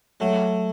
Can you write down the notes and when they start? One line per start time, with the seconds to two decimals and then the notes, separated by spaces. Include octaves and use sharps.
0.20 F#3 A3